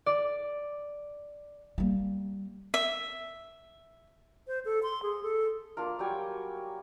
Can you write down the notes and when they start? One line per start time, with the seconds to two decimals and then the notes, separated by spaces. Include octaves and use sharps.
0.06 D5
1.78 G3 A#3
2.74 E5
4.47 C5
4.65 A4
4.83 C6
5.03 G#4
5.23 A4
5.77 A#3 D4 F4 A#4
5.99 F#3 G3 G5 G#5